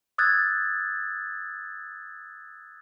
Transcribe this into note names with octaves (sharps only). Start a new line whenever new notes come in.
D#6 E6 F#6 G#6 A6